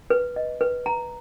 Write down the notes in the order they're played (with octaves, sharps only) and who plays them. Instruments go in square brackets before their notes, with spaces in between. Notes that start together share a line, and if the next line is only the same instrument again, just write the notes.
[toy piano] B4
D#5
B4
A#5